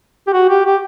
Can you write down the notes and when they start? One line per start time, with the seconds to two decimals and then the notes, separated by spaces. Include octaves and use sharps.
0.27 G4
0.33 F#4
0.49 G4
0.66 G4